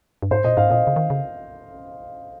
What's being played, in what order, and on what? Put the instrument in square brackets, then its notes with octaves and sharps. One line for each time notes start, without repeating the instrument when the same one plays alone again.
[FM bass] G2
[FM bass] G#2 [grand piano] C5
[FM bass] A#2 [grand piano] D#5
[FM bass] G#2 [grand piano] F5
[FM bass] A#2 [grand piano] D#5
[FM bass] C#3
D#3
C#3